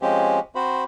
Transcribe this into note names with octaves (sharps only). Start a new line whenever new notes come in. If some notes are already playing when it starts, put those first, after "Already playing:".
F3 G#3 C4 C#4 G4
C4 F#4 C5 B5